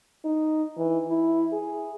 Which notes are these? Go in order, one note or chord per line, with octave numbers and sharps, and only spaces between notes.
D#4
E3
E4
G#4